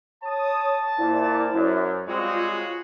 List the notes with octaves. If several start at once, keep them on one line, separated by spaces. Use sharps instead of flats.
C#5 A5 D#6
A#2 E4 C5 D5
F#2
G3 G#3 C4 F4 F#4 G#4 C#5